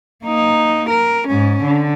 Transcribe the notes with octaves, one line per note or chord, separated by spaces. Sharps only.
A#3 D#4
A#4
G#2 C#4
D3